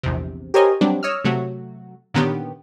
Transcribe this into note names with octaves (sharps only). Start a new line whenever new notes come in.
A#1 E2 C3
G4 A#4 C5 C#5 D#5 G#5
F#3 G3 C4 D4
C#5 D#5 E6 F6
C3 F#3 A3 F#4
A#2 D3 D#3 B3 C#4 G4